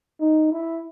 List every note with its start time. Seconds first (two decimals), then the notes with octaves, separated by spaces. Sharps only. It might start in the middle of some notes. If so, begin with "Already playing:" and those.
0.20 D#4
0.52 E4